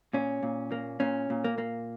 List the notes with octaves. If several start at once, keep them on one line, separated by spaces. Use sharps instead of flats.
A#2 C#4
A#2
A#3
A#2 C#4
A#2
A#3
A#3